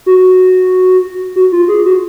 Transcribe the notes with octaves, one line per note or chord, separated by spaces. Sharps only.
F#4
F#4
F4
G#4
F#4